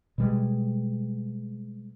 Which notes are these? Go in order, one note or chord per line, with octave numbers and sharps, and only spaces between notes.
B2 G3 G#3